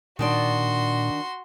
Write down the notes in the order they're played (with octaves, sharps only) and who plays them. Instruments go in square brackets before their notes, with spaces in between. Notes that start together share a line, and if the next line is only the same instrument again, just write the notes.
[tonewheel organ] A#2 [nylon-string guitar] D#3 D4 D5 [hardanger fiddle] F#4 C6